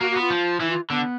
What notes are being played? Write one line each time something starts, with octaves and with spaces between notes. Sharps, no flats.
A#3 F#4
B3 F#4
F4
F3
E3 E4
F4
D3 B3